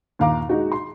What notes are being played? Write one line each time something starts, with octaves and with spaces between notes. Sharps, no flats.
D#2 A#2 F5 A#5 D6
G#3 D#4 F#4
C6